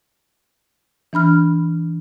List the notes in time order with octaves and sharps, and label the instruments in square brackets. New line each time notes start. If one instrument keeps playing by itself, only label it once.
[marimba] E3 D4 B5 F6